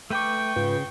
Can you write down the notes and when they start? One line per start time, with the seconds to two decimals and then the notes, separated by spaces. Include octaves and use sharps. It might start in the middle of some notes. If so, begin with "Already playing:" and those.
0.10 A3 B4 G5 C#6 D6
0.56 G#2 C#3 F4 B4